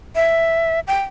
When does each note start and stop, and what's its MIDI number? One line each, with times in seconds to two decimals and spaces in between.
0.16 0.80 76
0.87 1.02 79